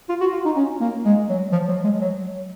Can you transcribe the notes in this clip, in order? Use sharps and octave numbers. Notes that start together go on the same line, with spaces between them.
F4
F#4
F4
D#4
C#4
A#3
G#3
F#3
F3
F#3
G#3
F#3